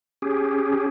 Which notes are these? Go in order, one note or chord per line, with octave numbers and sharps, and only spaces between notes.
C#4 G4 G#4